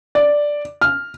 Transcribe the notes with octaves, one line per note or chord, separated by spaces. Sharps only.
D5
F6